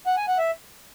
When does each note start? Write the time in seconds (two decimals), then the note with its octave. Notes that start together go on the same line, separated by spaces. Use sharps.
0.07 F#5
0.17 G#5
0.28 F#5
0.38 E5